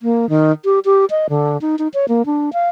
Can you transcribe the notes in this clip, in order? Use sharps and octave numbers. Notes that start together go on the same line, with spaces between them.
A#3
D#3
G4
G4
D#5
D3
D#4
D#4
C#5
A#3
D4
F5